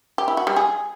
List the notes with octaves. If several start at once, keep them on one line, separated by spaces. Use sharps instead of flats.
G4
E4
F#4
G3
G#4